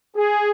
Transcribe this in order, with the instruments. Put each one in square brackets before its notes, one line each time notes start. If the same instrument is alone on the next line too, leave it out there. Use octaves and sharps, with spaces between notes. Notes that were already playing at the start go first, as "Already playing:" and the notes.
[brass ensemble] G#4